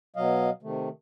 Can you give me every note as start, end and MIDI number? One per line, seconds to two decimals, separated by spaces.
0.16 0.50 47
0.16 0.50 54
0.16 0.50 75
0.16 0.50 77
0.63 0.89 48
0.63 0.89 51
0.63 0.89 57